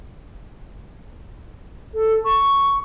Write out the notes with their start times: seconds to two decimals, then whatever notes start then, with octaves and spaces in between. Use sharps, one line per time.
1.94 A4
2.25 C#6